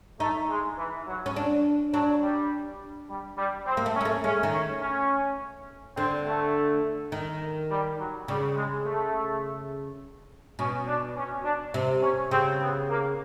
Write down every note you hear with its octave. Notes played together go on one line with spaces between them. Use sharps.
A3 D#4
G#3
E3
F#3
C#4
D4
F#3 D4
G3
G3
G3
C4
A#3
A3
C#4
A#3
A3
G#3 C#4
D#3
C#4
C#4
D3 C4
A3
D#3
G3
F#3
C#3 G3
G#3
A3
B2 C#4
D4
C#4
D4
C3
C#4
C#3 C4
B3
A#3